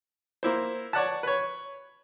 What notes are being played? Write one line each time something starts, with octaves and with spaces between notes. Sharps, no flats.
A#3 E4 C5
C#5 D5 F#5 A5
B4 C#5